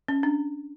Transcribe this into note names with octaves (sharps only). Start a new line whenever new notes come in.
C#4
D4